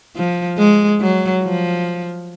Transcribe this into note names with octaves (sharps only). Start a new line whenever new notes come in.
F3
G#3
F#3
F3